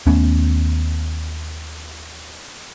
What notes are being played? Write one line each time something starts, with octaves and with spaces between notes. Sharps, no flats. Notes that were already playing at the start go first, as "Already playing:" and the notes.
D#2 A3 B3 C#4